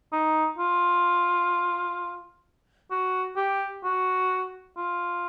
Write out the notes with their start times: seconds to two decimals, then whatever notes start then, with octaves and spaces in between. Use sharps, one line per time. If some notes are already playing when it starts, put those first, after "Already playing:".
0.13 D#4
0.58 F4
2.91 F#4
3.37 G4
3.84 F#4
4.77 F4